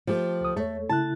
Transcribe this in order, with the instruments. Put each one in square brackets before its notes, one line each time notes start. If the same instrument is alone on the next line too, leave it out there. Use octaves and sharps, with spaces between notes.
[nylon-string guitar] F3 A3 G4
[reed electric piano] C#2 D#6
[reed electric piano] E2 C#5 [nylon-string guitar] A3
[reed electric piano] C#3 E4 F#6 [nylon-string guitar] A5